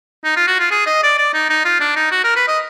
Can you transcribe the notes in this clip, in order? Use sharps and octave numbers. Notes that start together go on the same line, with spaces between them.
D#4
F4
F#4
F4
G#4
D#5
D5
D5
D#4
D#4
F4
D4
D#4
F#4
A#4
B4
D#5